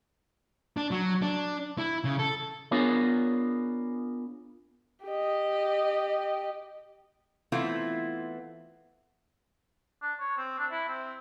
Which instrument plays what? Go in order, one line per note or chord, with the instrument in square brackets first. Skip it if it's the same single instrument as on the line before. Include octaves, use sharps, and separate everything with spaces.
[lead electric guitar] D4
F#3
D4
E4
C#3
A4
[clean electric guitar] B3 D4 F4 G#4 A#4 C#5
[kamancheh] G4 D#5
[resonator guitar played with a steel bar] E3 A3 B3 C4 E4 F4
[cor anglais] D4
C#5
C4
D4
E4
C4